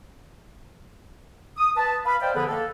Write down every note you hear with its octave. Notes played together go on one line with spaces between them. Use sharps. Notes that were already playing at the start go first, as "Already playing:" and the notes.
D#6
B4 A5
B4 F5 B5
C5 D5 D#5 F5 G5
D3 F3 B3 G#4 A4 B4
A#3 A4